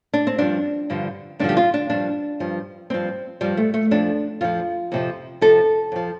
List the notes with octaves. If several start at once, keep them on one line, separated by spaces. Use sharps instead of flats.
D4
C4
G2 F3 D4
G2 D3 F3
G2 D3 F3 D4
G4
F4
D4
G2 F3 D4
G2 F3
G2 F3 C4
G2 F3 G3
A3
A3
F2 F3 D4
F2 F3 F4
F2 C3 F3
F2 C3 F3 A4
F2 F3